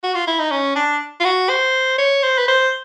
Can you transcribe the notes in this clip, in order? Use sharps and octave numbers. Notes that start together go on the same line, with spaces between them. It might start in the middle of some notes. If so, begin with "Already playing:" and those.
F#4
F4
E4
D#4
C#4
D4
F4
F#4
C5
C#5
C5
B4
C5